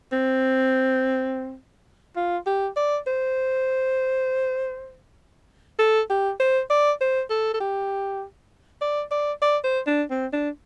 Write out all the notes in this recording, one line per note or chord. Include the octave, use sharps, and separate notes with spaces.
C4
F4
G4
D5
C5
A4
G4
C5
D5
C5
A4
A4
G4
D5
D5
D5
C5
D4
C4
D4